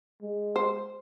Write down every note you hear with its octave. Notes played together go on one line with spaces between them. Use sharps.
G#3
C5